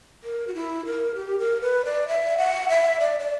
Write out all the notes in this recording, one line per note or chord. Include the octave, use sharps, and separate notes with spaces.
A#4
F#4
E4
A#4
G4
A#4
B4
D5
E5
F#5
E5
D5
D5